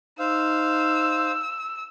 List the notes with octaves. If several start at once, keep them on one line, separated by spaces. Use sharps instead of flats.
D#4 C5 F5 E6